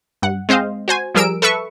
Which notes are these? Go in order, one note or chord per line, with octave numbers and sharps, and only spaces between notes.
G2 F#5
G#3 C4 C5 D#5 F5
F#4 C5 G#5
F3 G3 G#4 A#4 E6 D7
A4 B4 E5 C#6